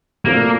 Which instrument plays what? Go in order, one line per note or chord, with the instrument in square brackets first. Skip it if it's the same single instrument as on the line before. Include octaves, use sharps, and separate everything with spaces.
[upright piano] A#2 A3 C4 F4 [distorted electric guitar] A#3